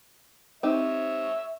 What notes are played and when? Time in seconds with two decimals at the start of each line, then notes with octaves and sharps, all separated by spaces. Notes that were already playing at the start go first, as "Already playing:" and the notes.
0.63 C4 D#4 G4 C#5 E5